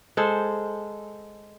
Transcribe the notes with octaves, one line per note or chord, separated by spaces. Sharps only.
G#3 A4 C5